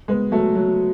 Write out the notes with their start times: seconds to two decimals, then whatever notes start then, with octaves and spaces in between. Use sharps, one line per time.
0.08 G#3 B3
0.31 F#3 A3
0.55 F#3